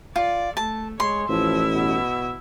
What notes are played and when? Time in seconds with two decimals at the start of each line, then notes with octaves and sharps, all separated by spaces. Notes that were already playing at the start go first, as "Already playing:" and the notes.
0.16 F4 D5
0.57 A3 A5
1.00 G#3 C#5 C6
1.29 A1 F3 E4 E5
1.74 B2